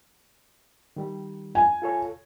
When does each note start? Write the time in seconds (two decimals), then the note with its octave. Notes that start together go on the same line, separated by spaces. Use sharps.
0.96 D#3 G3
1.55 G#5
1.82 F4 A4 C#5